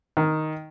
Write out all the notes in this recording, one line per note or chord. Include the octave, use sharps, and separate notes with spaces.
D#3